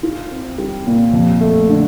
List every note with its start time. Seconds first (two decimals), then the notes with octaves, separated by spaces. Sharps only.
0.03 F4
0.31 C4
0.58 G3
0.87 A#2
1.13 F2
1.41 A3
1.69 D3